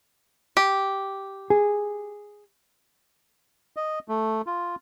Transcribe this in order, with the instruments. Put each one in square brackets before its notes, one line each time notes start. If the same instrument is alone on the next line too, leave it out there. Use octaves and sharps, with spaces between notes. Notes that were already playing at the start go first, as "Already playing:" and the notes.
[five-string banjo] G4
[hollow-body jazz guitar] G#4
[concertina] D#5
A3
F4